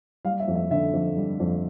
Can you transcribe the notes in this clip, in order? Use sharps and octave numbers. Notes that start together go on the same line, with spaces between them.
G3 F5
E5
F2
E5
D3 E5
F2
G3
F2